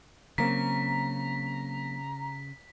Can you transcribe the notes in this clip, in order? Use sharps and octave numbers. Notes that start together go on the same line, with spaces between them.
C#3 F#3 A#3 C4 A#5 B6